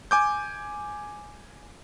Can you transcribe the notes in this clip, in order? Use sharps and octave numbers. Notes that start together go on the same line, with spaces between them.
G#5 D6 G6